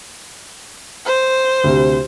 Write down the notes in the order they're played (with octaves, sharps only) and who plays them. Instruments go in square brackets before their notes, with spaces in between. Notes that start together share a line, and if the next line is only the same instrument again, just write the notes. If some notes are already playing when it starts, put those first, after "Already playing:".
[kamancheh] C5
[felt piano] D2 C3